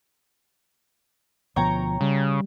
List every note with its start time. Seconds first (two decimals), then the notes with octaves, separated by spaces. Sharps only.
1.56 D2 B2 F3 C#5 G5 A#5
2.01 C#3 G3